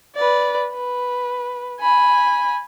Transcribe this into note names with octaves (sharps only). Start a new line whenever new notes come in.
B4 D5
B4
G#5 B5